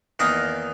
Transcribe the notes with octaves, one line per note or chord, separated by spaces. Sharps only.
E2 D#3 A#3 D#4 D#5